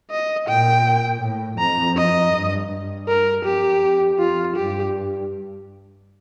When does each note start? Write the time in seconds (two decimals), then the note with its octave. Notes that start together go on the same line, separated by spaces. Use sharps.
0.11 D#5
0.48 A#2 G5
1.22 A2
1.59 F2 A#5
1.97 D#5
2.34 G2
2.70 G2
3.08 A#4
3.44 F2 G4
3.82 F2
4.19 F4
4.56 G2 G4